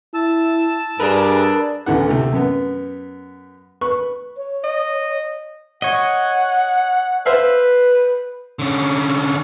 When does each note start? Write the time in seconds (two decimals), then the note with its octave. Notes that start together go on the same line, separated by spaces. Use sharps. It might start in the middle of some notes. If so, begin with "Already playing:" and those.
0.14 E4 A5 E6
1.00 G2 D4 G#4 A#4 B4
1.86 A1 D2 E3 B3 F#5
2.08 C3 A3
2.33 F#2 B3
3.81 B4 C#6
4.37 C#5
4.64 D#5
5.82 C#5 D#5 F#5
7.26 B4 C5 E5 F5
8.59 D3 C#4